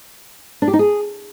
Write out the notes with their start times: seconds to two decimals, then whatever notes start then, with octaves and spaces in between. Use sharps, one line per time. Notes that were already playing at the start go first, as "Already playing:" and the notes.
0.62 D4
0.68 G4
0.73 D#4
0.79 G#4